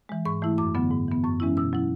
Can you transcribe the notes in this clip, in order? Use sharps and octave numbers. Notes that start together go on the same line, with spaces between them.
E3 G#3
G#2 C#6
E3 A3 E4
F#2 D6
D3 F#3 B3
G#2
E3 B3
F#2 C#6
E3 G#3 C#4 E4
B2 E6
F#3 C#4 E4